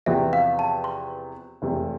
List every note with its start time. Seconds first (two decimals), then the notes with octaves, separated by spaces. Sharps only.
0.06 E2 C3 F3 B3 E5
0.33 F5
0.59 A5
0.84 C6
1.62 F1 E2 C3